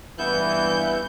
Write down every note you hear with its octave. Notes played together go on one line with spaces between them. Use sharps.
G2 E3 B3 E4 G6